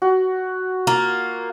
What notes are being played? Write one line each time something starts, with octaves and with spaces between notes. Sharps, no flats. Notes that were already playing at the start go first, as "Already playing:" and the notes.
F#4
A#3 F4